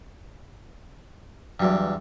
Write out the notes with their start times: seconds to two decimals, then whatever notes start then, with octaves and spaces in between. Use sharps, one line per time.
1.60 E2 G2 F#3 F#4 D5